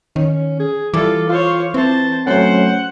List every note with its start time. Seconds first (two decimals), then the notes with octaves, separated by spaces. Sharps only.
0.16 D#3 C#4
0.60 G#4
0.94 E3 G3 F4 A4 D6
1.29 F4 C5 C#5
1.74 E3 C4 C5 A5
2.27 F#3 A3 C#4 C5 F#5